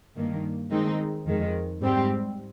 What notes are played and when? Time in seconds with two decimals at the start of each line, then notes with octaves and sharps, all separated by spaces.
0.16 G2 D#3 A#3
0.71 D#3 G#3 C4 D#4
1.26 F2 D#3 G#3
1.81 G#2 G3 C4 G4